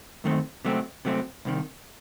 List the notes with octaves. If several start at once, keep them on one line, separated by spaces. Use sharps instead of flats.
F#2 D#3 A3 C4
C3 F#3 A3 C4
C3 F#3 A3 C4
C2 C3 D#3